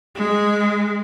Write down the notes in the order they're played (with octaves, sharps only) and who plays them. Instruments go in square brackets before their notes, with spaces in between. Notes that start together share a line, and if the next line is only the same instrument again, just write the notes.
[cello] G#3